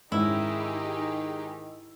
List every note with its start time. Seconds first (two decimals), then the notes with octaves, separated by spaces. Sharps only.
0.12 G#2 D#3 D#4 E4 G4 G#4